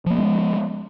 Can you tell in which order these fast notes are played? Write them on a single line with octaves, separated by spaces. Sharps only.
F3 A#3 B3 G#3